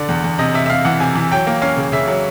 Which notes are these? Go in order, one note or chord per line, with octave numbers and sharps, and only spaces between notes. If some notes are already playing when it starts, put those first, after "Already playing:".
Already playing: D3 D5
E2
E2
C3 D#5
C3 E5
E5
C3 F5
E3 F#5
C3 G#5
E3
F#3 G5
A#3
C#4 F5
C#3
C#3 E5
F#3